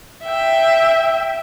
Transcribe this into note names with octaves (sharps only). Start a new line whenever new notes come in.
E5 G5